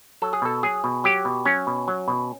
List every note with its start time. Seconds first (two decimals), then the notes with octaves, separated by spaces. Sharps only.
0.22 F#3 A4
0.33 G#4
0.42 B2 A4
0.63 F#3 G#4
0.84 B2
1.04 F#3 G4
1.25 B2
1.45 F#3 C#4
1.67 B2
1.88 F#3
2.08 B2